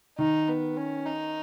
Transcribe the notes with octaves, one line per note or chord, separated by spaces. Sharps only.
D#3 D#4
B3
C#4
D#4